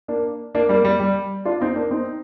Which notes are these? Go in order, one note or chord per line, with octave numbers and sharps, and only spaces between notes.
A#3 D4
A#3 D4
G3 A#3
G3
G3
D4 F4
C4 D#4
A#3 D4
C4 D#4